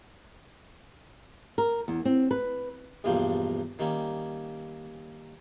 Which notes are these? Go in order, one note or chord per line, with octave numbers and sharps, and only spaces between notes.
A#4
E2
C4
B4
B1 E2 G2 F3 G3 A#3
D#3 G3 A#3 C#4